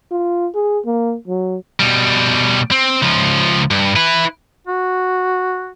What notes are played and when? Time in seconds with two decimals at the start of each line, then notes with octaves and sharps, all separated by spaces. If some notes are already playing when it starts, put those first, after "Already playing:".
0.11 F4
0.55 G#4
0.85 A#3
1.27 F#3
1.80 B2 G3
2.71 C4
3.02 C#2 F3
3.71 G2
3.96 E4 B4
4.67 F#4